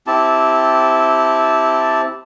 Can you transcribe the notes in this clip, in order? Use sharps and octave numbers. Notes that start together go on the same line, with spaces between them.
C4 E4 G4 A5